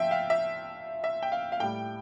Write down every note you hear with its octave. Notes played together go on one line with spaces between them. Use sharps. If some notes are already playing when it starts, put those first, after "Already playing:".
Already playing: F3 E5 G5
F5
E5
E5
G5
F5
F5
A2 G3 G5